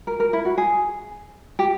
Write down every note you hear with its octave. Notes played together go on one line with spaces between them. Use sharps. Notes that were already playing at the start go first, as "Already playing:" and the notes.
A#4
A#4
E4
F#4
G#4
G4